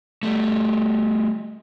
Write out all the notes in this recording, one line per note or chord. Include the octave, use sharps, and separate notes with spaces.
G3 A3